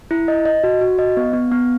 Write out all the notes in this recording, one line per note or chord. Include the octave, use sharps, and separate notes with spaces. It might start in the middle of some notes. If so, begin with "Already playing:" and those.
E4
D#5
D#5
F#4
F#4
D#5
B3
B3
B3